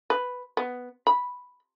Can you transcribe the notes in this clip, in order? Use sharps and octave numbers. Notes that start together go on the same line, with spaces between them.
B4
B3
B5